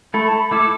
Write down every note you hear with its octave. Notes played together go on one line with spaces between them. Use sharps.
A3 E4 A4 B5
A5
B5
A3 E4 A4 D6